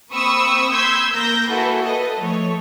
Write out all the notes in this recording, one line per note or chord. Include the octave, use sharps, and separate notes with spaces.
A#3 C4 B5 C#6 D#6 E6
C6 E6 G6 G#6 B6
A#3 A#4 G6 A#6
E3 A#3 E4 F#4 A4 B4
A4 B4 D#5
F3 A3 C#5